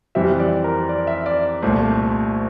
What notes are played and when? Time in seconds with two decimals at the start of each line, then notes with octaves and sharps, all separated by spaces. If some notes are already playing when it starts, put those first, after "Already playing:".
0.15 F2 E3 G3 C4 E5
0.40 D5
0.64 A#4
0.89 D5
1.07 E5
1.26 D5
1.63 C2 A#2 A3 C5